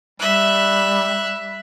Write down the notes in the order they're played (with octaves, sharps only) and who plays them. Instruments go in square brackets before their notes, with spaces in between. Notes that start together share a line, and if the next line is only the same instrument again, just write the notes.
[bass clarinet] G3 [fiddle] E5 F#6